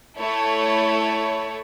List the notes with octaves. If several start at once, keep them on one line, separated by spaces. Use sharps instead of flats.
A3 E4 A4 C#5